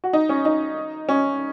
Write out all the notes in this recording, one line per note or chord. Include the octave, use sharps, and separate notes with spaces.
F#4
D#4
C#4
D#4
C#4